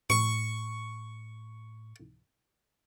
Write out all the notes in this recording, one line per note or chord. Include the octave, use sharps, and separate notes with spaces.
A2 C#6